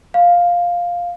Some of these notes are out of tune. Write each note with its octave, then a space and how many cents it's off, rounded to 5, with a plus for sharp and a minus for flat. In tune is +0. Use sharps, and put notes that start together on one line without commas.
F5 +5